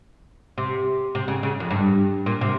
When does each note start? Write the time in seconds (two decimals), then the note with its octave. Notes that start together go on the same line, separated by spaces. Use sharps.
0.58 C3
1.15 C3
1.28 C#3
1.43 C#3
1.60 F2
1.71 G2
2.26 A#2
2.41 C3